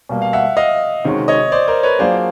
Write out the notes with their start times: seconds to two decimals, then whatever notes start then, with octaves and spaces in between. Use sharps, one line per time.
0.09 B2 G3 A#3
0.22 F5
0.33 E5 F#5
0.57 D#5 F5
1.05 C3 D#3 G#3 C#4 F#4
1.28 C#5 D#5
1.52 C5 D5
1.68 A#4 C5
1.83 B4 C#5
1.99 F#3 A#3 D4 F4 G#4 C5 D5